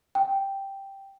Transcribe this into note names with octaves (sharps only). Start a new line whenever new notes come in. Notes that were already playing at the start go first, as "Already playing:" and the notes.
G5